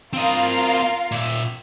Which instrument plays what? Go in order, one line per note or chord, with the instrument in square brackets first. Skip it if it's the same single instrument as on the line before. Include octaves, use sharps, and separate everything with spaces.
[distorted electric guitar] C4 D#5 [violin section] F4 A#4 F5
[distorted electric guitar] A#2 E5